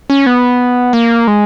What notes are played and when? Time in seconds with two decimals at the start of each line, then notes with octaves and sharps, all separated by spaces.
0.10 C#4
0.26 B3
0.93 A#3
1.28 G#3